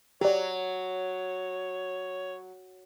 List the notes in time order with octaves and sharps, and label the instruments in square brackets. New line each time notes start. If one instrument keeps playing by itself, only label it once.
[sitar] F#3 [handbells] G4 D5 [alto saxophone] C#5